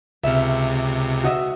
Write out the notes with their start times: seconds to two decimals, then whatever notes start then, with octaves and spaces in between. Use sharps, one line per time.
0.24 C#2 C3 E5 F6
1.24 F#4 D#5 E5